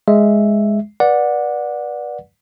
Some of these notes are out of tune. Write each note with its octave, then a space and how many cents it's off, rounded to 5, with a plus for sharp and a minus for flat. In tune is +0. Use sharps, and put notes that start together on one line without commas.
G#3 +0 E5 +0
B4 -25 D5 +0 F#5 -20